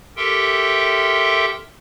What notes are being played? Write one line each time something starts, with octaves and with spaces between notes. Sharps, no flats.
G4 A4 A#4 E5 G5 C6